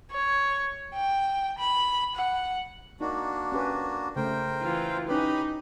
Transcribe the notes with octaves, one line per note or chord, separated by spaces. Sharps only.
C#5
G5
B5
F#5
A#3 D4 D#4 F#4
C#4 G4 B4
C#3 A3 A#4 C5 G5
E3 F4
C#4 D#4 G4 B4 B5